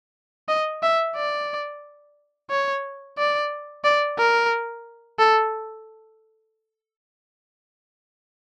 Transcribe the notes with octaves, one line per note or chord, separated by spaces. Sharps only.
D#5
E5
D5
C#5
D5
D5
A#4
A4